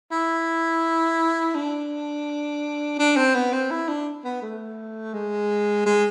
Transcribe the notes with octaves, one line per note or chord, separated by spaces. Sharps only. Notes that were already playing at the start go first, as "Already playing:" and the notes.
E4
D4
D4
C4
B3
C4
E4
D4
B3
A3
G#3
G#3